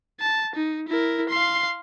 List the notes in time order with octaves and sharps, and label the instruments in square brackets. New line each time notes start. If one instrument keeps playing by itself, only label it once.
[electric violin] A5
D#4
E4 A#4
F5 C6